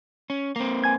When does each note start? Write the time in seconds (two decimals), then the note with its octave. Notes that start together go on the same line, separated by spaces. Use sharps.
0.30 C#4
0.56 A#3 C4
0.84 G#5 G#6